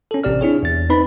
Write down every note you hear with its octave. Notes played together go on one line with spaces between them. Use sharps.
C#4 A4
A1 C3 C4 G4 D5 F6
D4 E4 G#4 C#5
E2 A6
C4 D#4 B4 B5